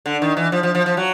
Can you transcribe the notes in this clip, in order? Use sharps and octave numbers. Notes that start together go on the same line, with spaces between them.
D3
D#3
E3
F3
F3
F3
F3
F#3